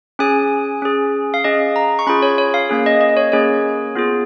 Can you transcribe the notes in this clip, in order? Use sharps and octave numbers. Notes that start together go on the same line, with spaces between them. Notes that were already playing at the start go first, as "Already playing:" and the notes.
C#4 G#4 G#5
C#4 G#4
F5
C#4 G#4 D#5
A#5
C#6
C#4 F4 G#4 B5
C#5
C#5
F5
A#3 C#4 G#4
D#5
D#5
C#5
A#3 C#4 G#4 C#5
B3 F4 G#4